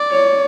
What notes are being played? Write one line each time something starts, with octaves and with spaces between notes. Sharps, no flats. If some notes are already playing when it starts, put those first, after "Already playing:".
Already playing: D5
C#5